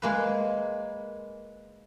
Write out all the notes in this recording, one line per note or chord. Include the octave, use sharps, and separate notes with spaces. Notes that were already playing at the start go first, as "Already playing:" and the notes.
G#3 A#3 B4